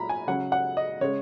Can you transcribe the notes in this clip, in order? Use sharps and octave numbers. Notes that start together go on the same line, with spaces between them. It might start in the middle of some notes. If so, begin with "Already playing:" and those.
Already playing: A#2 F#3 A#5 B5
G#5
C#3 F#3 F#5
F#5
D#5
C#3 G#3 C#5